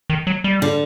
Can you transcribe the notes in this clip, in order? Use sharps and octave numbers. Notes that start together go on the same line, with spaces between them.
D#3
F#3
G3
D3